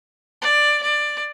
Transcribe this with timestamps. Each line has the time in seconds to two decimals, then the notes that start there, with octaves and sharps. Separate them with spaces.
0.42 D5
0.82 D5